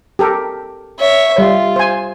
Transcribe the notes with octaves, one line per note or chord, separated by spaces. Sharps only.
G4 A4 A#4
C#5 E5
G3 F4
C5 G#5